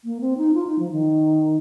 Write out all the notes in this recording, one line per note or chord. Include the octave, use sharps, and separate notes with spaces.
A#3
C4
D#4
F4
D#4
F3
D#3